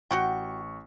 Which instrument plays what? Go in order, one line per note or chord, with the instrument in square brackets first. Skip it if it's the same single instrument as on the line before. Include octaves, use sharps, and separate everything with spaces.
[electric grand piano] A1 C#6 C#7 [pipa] F#4 F#5 G5